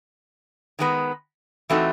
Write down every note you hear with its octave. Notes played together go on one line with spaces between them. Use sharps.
D#3 G#3 B3
E3 A3 C4 D#4 F#4